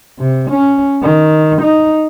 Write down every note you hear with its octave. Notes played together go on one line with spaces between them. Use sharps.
C3
C#4
D#3
D#4